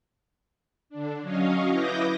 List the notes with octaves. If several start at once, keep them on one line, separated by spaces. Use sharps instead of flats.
D3 D4
F#3 C#4 C#5 D#5 F5
E4 B4 D6 D#6 G6 A#6